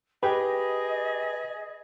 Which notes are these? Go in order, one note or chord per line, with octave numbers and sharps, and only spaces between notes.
G4 G#4 B4 D#5 G5